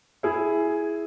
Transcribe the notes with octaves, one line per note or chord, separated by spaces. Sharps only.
E4 G#4